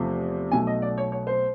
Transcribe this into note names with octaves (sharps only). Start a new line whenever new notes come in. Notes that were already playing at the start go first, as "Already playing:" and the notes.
Already playing: E2 C3 F3 A3
B1 B2 F#3 A3 G#5
D#5
D5
C#5
C#5
C5